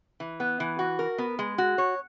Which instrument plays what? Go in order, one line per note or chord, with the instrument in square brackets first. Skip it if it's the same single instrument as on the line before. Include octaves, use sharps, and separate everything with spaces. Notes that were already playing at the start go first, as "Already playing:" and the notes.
[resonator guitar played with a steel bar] E3
B3
E3
F#4
A#4
B3
G#3
F#4
C#5